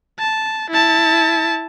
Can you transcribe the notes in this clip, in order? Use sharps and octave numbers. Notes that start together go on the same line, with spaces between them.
A5
E4 A5